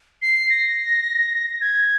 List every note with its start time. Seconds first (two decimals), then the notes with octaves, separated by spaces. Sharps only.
0.22 C7
0.50 A#6
1.61 G#6